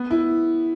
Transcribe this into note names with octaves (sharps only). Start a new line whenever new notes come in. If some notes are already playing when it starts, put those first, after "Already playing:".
Already playing: B3
E4